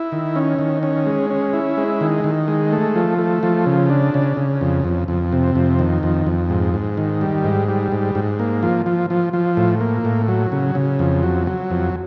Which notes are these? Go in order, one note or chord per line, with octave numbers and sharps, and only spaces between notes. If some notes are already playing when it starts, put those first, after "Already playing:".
Already playing: E4
D#3
C#4
D#3
C#4
G#3
C#4
E4
G#3
D#3
D#3
G#3
A3
F3
A3
F3
C#3
D4
C#3
C#3
F2
F2
F2
C3
F2
D#3
F2
F2
G#2
G#2
D#3
G3
G#2
G3
G#2
G#2
A#3
F3
F3
F3
F3
A2
A#3
A2
F#3
C#3
C#3
F2
F#3
F#3
F2